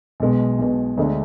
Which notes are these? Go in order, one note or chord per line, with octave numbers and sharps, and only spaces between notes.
B1 B2 G#3
B1 B2 G#3
D2 D3 G#3 D4